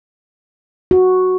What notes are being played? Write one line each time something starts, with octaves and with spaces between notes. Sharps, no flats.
F#4